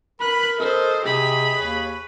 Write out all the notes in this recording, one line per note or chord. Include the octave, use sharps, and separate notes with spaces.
A#4 B4 B5 F#6
A4 C5 D#5
C3 G4 G#4 D#5 B5
D#2 B4 C#5